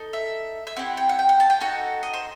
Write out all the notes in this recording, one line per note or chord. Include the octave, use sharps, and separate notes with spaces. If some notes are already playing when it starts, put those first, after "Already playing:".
Already playing: D#4 A4
E5
E5
C4 E4 G4 F#5
G5
F#5
G5
F#5
A5
G5
D#4 F#4 A4 F#5
D#5
C5